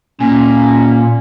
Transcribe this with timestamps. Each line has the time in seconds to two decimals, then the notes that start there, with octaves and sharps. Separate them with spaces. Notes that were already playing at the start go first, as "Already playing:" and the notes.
0.20 A#2 C#4